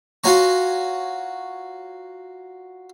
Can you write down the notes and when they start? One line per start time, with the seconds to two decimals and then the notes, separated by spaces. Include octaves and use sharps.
0.24 F4 F#4 C#5 G#5 A#5 C#6